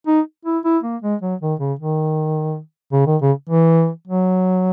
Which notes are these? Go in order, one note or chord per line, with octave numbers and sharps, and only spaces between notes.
D#4
E4
E4
A#3
G#3
F#3
D#3
C#3
D#3
C#3
D#3
C#3
E3
F#3